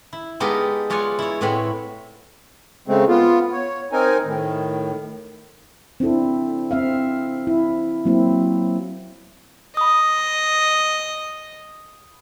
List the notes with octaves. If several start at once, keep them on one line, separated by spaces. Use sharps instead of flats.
E4
G#3 B3 D#4 G4 A4 A#4
G#3 F4 C#5 D5 F#5 G#5
E4 C#5
A2 B3 C4 B4 C#5 F#5
C#3 G#3 A3 C4
B3 F4
C#5
C4 D#4 A#4 G#5
A2 D#3
C4 D4 E4 A4
C4 E5 F5
E4
F#3 A#3 C4 E4
D#5 B5 D#6